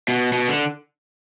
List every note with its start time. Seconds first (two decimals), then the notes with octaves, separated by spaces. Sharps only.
0.08 B2
0.33 B2
0.49 D3